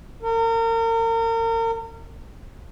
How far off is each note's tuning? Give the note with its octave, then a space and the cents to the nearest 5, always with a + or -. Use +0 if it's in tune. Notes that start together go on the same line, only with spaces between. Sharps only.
A#4 -35